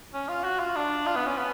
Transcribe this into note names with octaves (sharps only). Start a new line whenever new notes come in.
C#4
F4
F#4
F4
D4
F4
B3
C#4
B3